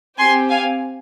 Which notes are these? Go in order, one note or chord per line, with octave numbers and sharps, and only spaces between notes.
C4 G4 G#5 C6
F5 G#5